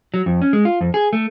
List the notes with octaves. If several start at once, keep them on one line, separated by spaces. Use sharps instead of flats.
F#3
F2
C#4
G#3
F4
F2
G#4
A3